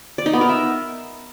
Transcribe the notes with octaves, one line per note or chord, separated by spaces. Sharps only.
D5
D#4
B3
A#4
E5